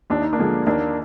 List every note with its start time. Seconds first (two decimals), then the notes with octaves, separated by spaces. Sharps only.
0.10 D#2 D4
0.21 D#4
0.33 A#3 D4
0.39 D3 F3 G#3
0.66 D#2 A#3 D4